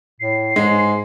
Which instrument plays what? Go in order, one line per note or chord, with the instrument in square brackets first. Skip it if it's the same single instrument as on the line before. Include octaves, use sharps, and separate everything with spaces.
[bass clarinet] A2 [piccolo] C7
[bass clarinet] G#2 [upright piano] G#3